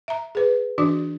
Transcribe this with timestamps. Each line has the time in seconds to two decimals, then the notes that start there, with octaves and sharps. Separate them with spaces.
0.08 E5 A#5
0.35 G#4 B4
0.78 E3 D4 F#4 D5